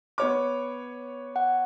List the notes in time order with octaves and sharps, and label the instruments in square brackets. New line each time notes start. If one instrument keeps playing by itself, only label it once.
[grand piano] B3 C#5 D6
[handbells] F#5